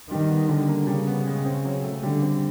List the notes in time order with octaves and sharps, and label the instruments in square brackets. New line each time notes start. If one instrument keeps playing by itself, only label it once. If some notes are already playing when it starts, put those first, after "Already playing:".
[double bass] D#3 [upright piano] G3
[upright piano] B3
[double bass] D3 [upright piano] G3
[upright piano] A#3
[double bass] C#3 [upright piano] G3
[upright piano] B3
G#3
C4
F#3
A3
[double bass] D3 [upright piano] G3
[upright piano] C4